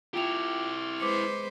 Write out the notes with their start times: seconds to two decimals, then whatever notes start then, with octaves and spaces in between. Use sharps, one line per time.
0.14 E4 F4 G4 G5 F7
1.00 G#3 B4 C5 D6 C#7